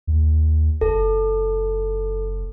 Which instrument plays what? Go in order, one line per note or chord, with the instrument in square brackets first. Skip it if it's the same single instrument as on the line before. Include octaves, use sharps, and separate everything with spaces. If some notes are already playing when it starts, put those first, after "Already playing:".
[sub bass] D#2
[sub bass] F#1 [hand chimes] A4